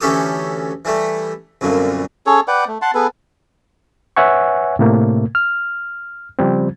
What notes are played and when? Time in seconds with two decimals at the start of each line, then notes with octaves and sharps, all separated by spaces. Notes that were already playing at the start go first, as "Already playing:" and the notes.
0.01 D2 E3 C#4 G4 A4 D#6
0.85 E3 G3 A3
1.61 C2 F#2 A#2 D3
2.26 C#4 G#4 A4 C#5
2.48 B4 D5 F#5 G5
2.68 A3
2.82 F#5 A5 C6
2.94 B3 G#4 A4 B4
4.17 B4 C#5 E5 F#5 G#5 C#6
4.79 A2 C3 A3 A#3
5.35 F6
6.39 C#3 F3 G3 C4